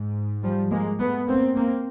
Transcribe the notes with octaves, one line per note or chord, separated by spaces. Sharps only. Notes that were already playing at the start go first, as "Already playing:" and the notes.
Already playing: G#2
F3 G3
G#3 A#3
A3 B3
A#3 C4
A#3 C4